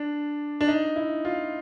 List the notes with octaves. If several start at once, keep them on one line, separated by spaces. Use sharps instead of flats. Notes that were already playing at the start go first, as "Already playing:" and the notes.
Already playing: D4
D4
D#4
E4
F4